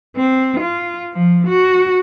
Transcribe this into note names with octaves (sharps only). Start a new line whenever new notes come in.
C4
F4
F3
F#4